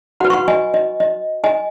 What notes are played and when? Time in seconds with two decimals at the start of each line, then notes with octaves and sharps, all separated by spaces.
0.20 F#4 B4 F#5 B5
0.30 C#6
0.33 F#5 B5
0.48 D#5 G#5
0.74 D#5
1.00 D#5
1.44 D#5 G#5